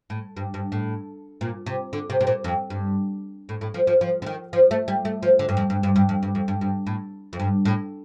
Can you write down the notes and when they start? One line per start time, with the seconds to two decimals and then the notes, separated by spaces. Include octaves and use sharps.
0.10 A2
0.37 G2
0.54 G2
0.72 A2
1.41 A#2
1.66 C3
1.93 D3
2.10 C3
2.21 C3
2.27 A#2
2.44 F2
2.70 G2
3.49 A2
3.61 A2
3.74 F3
3.87 F3
4.01 F3
4.22 D3
4.26 D#3
4.53 F3
4.71 A3
4.88 G3
5.05 A3
5.23 F3
5.39 D3
5.49 G2
5.57 F2
5.70 G2
5.83 G2
5.96 G2
6.09 F2
6.23 G2
6.35 F2
6.48 G2
6.61 G2
6.87 A2
7.33 F2
7.39 G2
7.65 A2